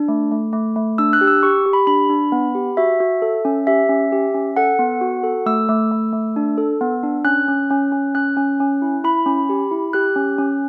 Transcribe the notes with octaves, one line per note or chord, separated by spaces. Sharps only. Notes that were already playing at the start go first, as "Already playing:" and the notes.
Already playing: D4
A3
A3
A3
A3
D4 E6
F#6
G4
E6
G4 C#6
G4
B5
D4 B5
D4
B3
G4
F#4 E5
F#4
A4
C#4
G4 E5
C#4
G4
C#4
A4 F#5
B3
F#4
A4
A3 E6
A3
A3
A3
D4
A4
B3
D4
C#4 F#6
C#4
C#4
C#4
C#4 F#6
C#4
C#4
E4
E4 B5
C#4
G4
E4
G4 F#6
C#4
C#4